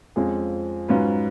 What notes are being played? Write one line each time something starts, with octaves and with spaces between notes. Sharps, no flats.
F2 F3 G#3 C#4 G#4
G#2 F#3 C#4 F4 B4